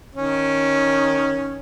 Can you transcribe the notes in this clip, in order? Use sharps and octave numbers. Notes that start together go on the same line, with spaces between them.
D#3 C#4